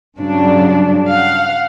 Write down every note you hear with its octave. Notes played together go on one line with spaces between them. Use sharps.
G2 C#3 F#3 D4
F5 F#5